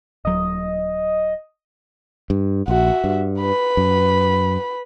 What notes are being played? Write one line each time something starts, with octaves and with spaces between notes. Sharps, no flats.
D#1 F#3 D#5
G2
A#1 F#4 E5
G2
B4 B5
F#2